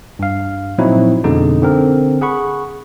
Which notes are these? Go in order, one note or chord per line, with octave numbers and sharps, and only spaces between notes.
G2 F5
A#2 F3 F#3 C4 D#4 E4
F2 B2 D3 G#3 D#4
D3 C4 A#4
G#4 F#5 B5 C#6